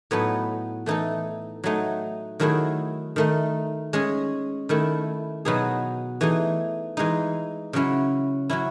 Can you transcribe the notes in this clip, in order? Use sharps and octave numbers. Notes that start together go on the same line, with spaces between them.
A2 F#3 B3 D#4 A4
E3 A3 D#4 A4
F#3 A3 D#4
D#3 F#3 A3 E4 G#4
D#3 A3 D#4
G#3 C#4 G#4
D#3 A3 E4 A4
B2 F#3 B3 D#4 G#4
E3 A3 D#4 G#4
E3 G#3 D#4
C#3 F#3 C#4 E4
F#3 C#4 E4